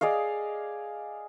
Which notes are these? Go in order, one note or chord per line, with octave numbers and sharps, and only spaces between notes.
G#4 D5 D#5 F5